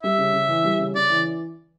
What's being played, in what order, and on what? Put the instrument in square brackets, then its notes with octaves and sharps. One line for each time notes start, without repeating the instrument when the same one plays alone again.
[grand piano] G3 [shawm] E5
[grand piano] C#3
C#3
E3
G3
C#3
[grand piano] C#3 [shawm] D5
[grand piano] E3